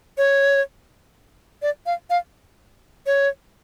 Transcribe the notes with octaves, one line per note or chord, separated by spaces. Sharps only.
C#5
D5
F5
F5
C#5